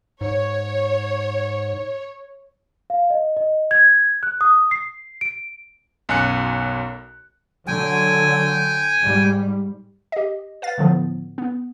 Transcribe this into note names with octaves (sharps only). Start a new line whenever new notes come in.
G#2 C#5
F5
D#5
D#5
G#6
F#6
D#6
C7
D7
B1 F#2 G#5 F#6 C#7
D3 F#3 G5 G#5
G#2 G3
G4 D#5
B4 F5 A6
A2 D3 F3 B3
B3